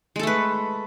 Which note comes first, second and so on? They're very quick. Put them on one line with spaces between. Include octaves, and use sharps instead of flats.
G#3 A4 A3 B4